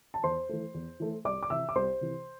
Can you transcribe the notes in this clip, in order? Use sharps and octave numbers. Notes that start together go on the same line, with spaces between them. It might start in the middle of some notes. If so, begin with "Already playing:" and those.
A5
E2 C5 C6
E3 A3
E2
E3 A3
C2 D5 D6
D6
C3 E3 E5 E6
D6
C2 C5 C6
C3 E3